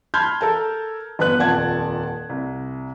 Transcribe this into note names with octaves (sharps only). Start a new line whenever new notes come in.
A5 B5 C6 F6 G6 G#6
A4 A#4 A5
G1 B3 B4 F#6
D#1 F2 D5 F#5 A5 G#6
C2